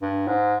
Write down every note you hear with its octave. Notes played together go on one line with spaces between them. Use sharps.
G2
G#2